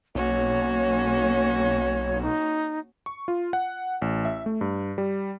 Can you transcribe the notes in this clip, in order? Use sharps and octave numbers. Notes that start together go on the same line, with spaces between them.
B1 A#3 C#4 F#4 C#5
D#4
C#6
F4
F#5
A1
E5
A3
G2
G3